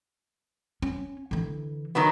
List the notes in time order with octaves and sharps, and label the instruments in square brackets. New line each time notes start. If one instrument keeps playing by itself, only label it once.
[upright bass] C#4
D3 E3
[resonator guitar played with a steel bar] D#3 F#3 B3